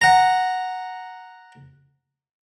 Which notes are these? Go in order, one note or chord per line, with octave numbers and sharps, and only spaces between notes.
F#5 A#5